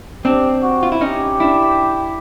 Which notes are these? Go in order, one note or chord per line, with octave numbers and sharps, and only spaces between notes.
C4 D4 G4
F#4
F4
E4
C#4 D#4 G4
D4 E4